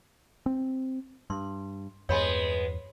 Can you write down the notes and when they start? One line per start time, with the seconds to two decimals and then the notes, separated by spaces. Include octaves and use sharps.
0.46 C4
1.30 G2 C6
2.09 E2 G2 G#3 B3 C#5 B5 C6